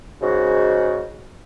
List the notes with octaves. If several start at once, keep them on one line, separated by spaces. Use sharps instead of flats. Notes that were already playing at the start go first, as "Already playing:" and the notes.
G#2 C#3 F#4